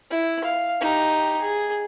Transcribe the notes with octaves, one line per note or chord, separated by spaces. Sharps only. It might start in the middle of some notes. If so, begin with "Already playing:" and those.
E4
F5
D#4 G4
G#4